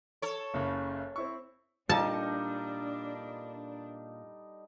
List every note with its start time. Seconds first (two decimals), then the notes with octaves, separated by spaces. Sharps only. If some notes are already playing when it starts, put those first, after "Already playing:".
0.22 A4 C#5
0.54 F#1 C#3
1.16 C4 E4 C#6
1.89 A#2 G3 D4 D#4 A4 F5 A5